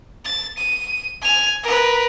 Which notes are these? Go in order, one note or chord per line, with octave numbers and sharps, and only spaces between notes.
A6
D#7
G#5 F7
A#4 B4